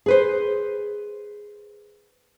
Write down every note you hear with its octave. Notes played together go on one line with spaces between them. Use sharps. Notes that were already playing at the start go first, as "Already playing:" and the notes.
G#4 B4 C5